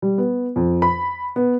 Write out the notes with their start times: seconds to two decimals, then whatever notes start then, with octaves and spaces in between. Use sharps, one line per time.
0.02 G3
0.18 B3
0.56 F2
0.82 B5
1.36 B3